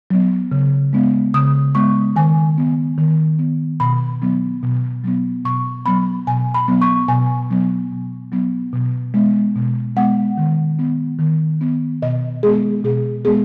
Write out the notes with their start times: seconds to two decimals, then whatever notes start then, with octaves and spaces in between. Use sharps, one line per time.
0.10 F#3 B3
0.52 C#3
0.93 G#3 B3
1.34 C#3 D#6
1.75 G#3 B3 C#6
2.16 D#3 G#5
2.58 B3
2.98 D#3
3.39 B3
3.80 B2 B5
4.22 F#3 B3
4.63 B2
5.04 F#3 B3
5.45 B2 C#6
5.86 F#3 B3 B5
6.27 B2 G#5
6.54 B5
6.68 F#3 B3
6.82 C#6
7.08 B2 G#5
7.51 F#3 B3
7.92 B2
8.32 F#3 B3
8.73 B2
9.14 G#3 B3
9.55 B2
9.96 G#3 B3 F#5
10.38 D#3
10.79 B3
11.19 D#3
11.61 B3
12.02 B2 D#5
12.43 G#3 B3 G#4
12.84 B2 G#4
13.25 G#3 B3 G#4